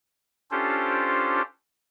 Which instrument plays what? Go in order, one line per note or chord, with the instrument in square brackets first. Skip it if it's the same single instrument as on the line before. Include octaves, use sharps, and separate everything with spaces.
[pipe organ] C#4 D4 F4 G4 A4 C5